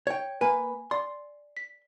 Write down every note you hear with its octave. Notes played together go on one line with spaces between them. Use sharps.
C#5 G5
A#3 B4 G#5
D5 C6
B6